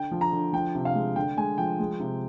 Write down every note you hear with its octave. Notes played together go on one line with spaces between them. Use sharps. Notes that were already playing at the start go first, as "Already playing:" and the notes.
Already playing: D3 G5
F3
A#5
D3
F3 G5
C3
F5
G#3
D3 G5
G#3 G#5
F3 G5
G#3
C3